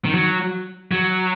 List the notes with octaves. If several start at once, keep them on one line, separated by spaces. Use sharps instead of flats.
D#3
F#3
F#3